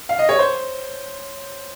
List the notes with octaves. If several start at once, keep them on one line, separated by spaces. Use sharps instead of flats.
F5
D#5
C#5
C5